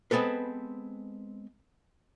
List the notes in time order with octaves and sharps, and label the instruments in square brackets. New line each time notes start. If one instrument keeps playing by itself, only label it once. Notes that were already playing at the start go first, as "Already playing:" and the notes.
[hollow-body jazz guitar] G#3 B3 C4 A4 B4